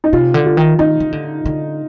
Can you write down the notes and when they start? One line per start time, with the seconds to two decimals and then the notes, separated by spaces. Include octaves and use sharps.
0.04 D#4
0.13 C3 F4
0.34 D3
0.46 F4
0.57 D#3
0.79 D#3 D#4
1.00 D#3
1.13 D3
1.46 D3